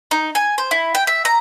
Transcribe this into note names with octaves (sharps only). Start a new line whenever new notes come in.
D#4
G#5
C5
E4
G5
E5
A#5